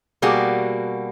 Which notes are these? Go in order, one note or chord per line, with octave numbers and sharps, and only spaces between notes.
B2 G3 A#3 F#4 G#4